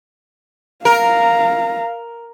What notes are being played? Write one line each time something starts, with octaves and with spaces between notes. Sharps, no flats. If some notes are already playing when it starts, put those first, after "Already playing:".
A#4 F5 A#5